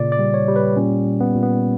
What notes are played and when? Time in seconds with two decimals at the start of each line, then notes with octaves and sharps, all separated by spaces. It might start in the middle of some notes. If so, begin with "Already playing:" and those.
Already playing: A#2 C#3 D5
0.12 D5
0.19 G3
0.34 C#5
0.48 G3
0.56 B4
0.77 A#2 C#4
1.06 A#2
1.20 B3
1.35 A#2
1.43 B3